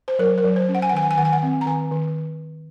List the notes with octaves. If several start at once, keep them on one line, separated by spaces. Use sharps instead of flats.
C5
F#3 A#4
A#4
F#3
C5
C#4
F#5
G#5
F#5
D#3 G#5
F#5
G#5
D#3 F#5
G#5
F#5
C4
A#5
D#3 G#5
D#3